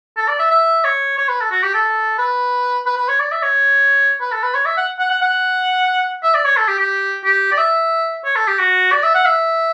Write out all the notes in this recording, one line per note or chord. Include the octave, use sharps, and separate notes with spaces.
A4
D5
E5
E5
C#5
C#5
B4
A4
F#4
G4
A4
B4
B4
B4
C#5
D5
E5
C#5
B4
A4
B4
C#5
E5
F#5
F#5
F#5
F#5
E5
D5
C#5
A4
G4
G4
G4
D5
E5
C#5
A4
G4
F#4
D5
E5
F#5
E5